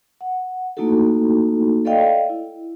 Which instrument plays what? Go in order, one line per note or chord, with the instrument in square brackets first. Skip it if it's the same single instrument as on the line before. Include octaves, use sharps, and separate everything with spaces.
[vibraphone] F#5
A3 A#3 D#4 E4 F#4 A4
A4 D5 D#5 F5 G5
E4